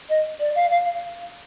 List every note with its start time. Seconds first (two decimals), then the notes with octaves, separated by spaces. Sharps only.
0.09 D#5
0.39 D5
0.55 F5
0.70 F5